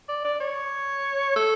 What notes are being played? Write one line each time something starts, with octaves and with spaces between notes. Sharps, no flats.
D5
D5
C#5
A4